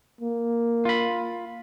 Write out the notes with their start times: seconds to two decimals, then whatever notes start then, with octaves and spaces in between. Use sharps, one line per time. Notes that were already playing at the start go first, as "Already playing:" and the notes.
0.21 A#3
0.85 F4 B5